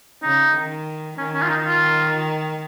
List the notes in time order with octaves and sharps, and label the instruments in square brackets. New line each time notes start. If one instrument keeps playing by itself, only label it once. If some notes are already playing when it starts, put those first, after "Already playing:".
[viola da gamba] C#3 [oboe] D#4
[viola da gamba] D#3
[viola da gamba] D#3 [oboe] C#4
[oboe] C#4
F4
D#4
F4